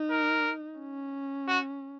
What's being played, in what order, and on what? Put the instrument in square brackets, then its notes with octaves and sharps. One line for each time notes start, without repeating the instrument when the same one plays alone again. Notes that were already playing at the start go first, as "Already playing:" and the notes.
Already playing: [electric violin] D#4
[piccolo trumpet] A#4
[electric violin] C#4
[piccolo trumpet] F#4